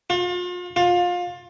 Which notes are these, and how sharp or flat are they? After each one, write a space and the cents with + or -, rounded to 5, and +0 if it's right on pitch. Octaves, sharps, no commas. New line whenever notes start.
F4 +40
F4 +25